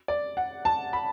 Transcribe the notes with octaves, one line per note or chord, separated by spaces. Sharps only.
D5
F#5
A5
B5